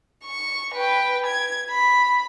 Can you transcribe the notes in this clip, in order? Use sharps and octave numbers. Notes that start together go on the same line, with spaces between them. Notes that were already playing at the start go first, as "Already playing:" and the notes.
C#6
B4 G5
G#6
B5